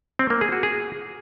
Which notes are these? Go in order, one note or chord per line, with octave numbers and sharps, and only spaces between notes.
C4
A#3
G#4
F#4
G#4